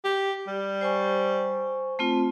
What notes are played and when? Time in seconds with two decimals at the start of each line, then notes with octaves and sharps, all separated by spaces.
0.05 G4
0.47 G3
0.81 C5 G#5 C#6
1.99 A3 C4 F4